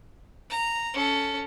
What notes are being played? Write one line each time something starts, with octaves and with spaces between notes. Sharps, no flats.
A#5
C#4 A4